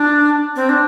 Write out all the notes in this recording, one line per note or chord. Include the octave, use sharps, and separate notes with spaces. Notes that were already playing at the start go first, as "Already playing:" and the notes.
Already playing: D4
C4
D4